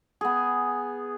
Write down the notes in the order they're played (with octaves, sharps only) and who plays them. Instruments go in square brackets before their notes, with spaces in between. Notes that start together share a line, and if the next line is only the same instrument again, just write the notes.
[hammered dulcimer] B3 G#4